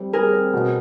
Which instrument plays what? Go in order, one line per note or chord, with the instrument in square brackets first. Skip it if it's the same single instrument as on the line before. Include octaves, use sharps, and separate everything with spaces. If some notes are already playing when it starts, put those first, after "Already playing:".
Already playing: [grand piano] G3 C4
[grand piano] G3 [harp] G#4 A#4
[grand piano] C4
B2